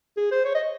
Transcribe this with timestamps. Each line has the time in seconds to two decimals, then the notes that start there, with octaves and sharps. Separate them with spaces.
0.17 G#4
0.31 C5
0.45 C#5
0.55 D#5